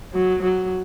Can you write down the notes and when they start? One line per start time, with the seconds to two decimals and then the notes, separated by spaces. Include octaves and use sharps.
0.13 F#3
0.43 F#3